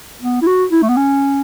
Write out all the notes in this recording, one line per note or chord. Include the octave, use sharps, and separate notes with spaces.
B3
E4
F#4
E4
A3
B3
C#4